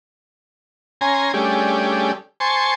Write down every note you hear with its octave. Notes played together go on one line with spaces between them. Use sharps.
C#4 G#5 A#5 C6
G3 A3 C#4 D4 G4 G#4
C5 G#5 A5 C6 C#6